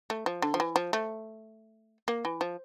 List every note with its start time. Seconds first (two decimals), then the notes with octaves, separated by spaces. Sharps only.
0.10 A3
0.26 F3
0.42 D3
0.54 F3
0.60 E3
0.76 F3
0.93 A3
2.08 A#3
2.25 E3
2.41 F3